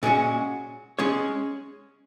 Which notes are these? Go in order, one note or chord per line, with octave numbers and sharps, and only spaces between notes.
A#2 G#3 C#4 F#4
G#3 C#4 G#4 C#5